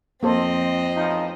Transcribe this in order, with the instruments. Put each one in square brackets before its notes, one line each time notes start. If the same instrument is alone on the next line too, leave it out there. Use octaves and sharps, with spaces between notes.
[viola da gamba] F2 D#5 [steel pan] A#3 A4 C5 [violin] C4
[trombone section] A1 F3 D#4